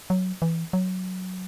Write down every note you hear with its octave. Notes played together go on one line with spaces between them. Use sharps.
F#3
E3
F#3